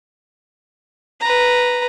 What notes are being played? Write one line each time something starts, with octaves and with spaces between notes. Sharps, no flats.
B4 A#5